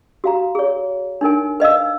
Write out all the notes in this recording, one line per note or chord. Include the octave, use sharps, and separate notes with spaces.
F#4 F5 A#5
G#4 C#5
D4 D#4 A#4 G#5
B4 D#5 F5 E6